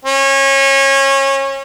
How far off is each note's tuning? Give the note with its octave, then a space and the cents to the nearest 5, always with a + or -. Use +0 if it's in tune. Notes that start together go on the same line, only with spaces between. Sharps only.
C#4 -25